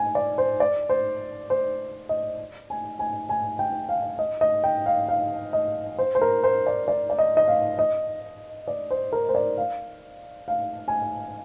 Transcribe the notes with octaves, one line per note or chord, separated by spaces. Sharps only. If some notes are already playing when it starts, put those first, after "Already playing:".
Already playing: G#5
D5
C5
D5
C5
C5
D#5
G#5
G#5
G#5
G5
F5
D#5
D#5
G5
F5
F5
D#5
C5
C5
A#4
C5
D5
D5
D5
D#5
D#5
F5
D#5
D5
C5
A#4
C5
D5
F5
F5
G#5